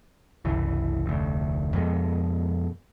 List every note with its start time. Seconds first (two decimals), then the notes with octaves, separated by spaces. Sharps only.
0.45 F#1 C2 E3
1.06 F1 D2
1.73 F2 B2 G#3